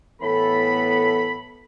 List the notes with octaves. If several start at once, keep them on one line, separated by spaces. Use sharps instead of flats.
A2 E3 B3 A4 B5